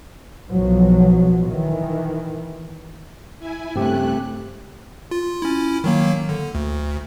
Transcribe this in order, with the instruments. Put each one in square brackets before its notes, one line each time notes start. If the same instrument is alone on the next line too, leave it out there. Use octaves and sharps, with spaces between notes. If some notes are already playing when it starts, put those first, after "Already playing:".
[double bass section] B1 B2 F3 F#3
D#3 E3
[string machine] E4 G#5
[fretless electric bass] G2 C#3 [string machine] A3 F#6 [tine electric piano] C4 G4
[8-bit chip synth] F4
C#4 E4
D#3 F#3 A#3
D3
D2